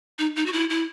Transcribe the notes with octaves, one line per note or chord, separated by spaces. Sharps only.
D#4
D#4
F#4
E4
E4